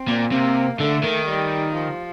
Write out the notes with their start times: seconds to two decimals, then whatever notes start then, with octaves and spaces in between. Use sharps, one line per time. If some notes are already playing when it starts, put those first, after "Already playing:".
Already playing: C4
0.08 A#2
0.32 C3 A#3
0.80 D3 A3
1.04 D#3
1.28 G3
1.75 F3